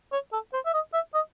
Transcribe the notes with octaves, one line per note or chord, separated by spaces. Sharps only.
C#5
A4
C5
E5
D#5
E5
D#5